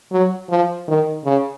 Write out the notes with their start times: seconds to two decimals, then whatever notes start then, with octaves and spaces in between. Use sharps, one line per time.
0.12 F#3
0.50 F3
0.88 D#3
1.25 C#3